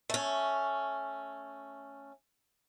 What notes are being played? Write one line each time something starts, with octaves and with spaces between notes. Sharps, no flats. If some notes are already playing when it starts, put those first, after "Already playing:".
A3 C#4